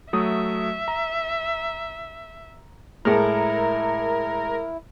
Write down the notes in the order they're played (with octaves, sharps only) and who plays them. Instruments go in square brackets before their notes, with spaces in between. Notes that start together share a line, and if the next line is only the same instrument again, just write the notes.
[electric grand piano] F#3 A3 D#6 [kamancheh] E5
[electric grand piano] A#5
[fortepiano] A2 G#3 [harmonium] E4 [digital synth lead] A#4